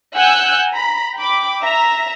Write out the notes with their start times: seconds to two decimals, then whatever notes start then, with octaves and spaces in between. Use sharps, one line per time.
0.16 F#5 G#5 E6 F#6 G6
0.71 A#5 B5
1.16 G5 B5 D6
1.63 E5 A#5